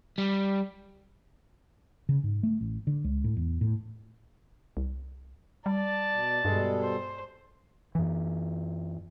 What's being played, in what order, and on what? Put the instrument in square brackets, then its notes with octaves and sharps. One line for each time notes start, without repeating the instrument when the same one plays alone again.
[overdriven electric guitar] G3
[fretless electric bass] C#3
G#2
A3
A1
D3
C#2
A2
E2
A2
[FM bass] C2
[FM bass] G3 [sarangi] D5 [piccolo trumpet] A5
[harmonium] B2
[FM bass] G2 [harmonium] B2 G3 A4 [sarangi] G#3
[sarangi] C5
[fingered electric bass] F#2 E3